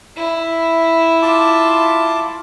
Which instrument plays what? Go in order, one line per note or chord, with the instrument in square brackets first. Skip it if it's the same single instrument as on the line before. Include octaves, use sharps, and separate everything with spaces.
[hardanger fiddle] E4
[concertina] F4 A5 D6